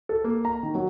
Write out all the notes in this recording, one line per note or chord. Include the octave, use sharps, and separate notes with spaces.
A4
A#3
A#5
D#3
F#3